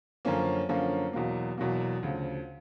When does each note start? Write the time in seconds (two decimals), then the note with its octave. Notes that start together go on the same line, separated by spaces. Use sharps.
0.25 F#2 D3 F3 A#3 C#4
0.69 F#2 D3 F3 A#3 C#4
1.13 E2 B2 F#3 A#3
1.58 E2 B2 F#3 A#3
2.03 D2 C#3 F3